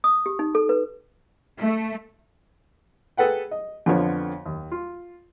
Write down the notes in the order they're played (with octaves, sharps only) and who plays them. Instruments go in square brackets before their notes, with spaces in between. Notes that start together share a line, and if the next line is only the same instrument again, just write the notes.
[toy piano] D#6
G4
D#4
A4
B4
[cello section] A3
[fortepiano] G#4 A4 B4 F#5 G5
D#5
F2 D3 F3 B3 C#5
D#2
F4